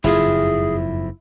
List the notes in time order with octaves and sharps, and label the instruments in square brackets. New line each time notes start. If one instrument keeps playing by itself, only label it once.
[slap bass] F#1 F2 G#2 [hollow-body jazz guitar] E4 F4 [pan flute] G#4